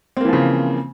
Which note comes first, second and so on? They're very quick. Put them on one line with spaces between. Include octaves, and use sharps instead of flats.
C4 A#3 E3 F3 C#3